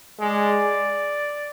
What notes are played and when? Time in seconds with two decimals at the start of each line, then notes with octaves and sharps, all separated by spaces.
0.20 G#3 D5